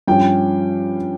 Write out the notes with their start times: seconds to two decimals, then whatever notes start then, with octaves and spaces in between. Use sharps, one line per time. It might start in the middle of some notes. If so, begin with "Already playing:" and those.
0.08 G2 F3 C#4 G5